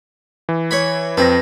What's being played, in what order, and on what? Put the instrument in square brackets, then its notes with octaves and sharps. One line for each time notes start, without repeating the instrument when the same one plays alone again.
[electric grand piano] E3
[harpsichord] C#5 B5
[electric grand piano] F2 C4 A#6 [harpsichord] B4